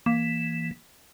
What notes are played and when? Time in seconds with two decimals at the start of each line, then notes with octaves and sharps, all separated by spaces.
0.06 E3 A#3